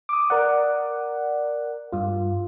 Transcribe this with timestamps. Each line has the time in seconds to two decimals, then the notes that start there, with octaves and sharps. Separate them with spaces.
0.09 D6 D#6
0.30 A#4 D5 F#5
1.92 G2 F4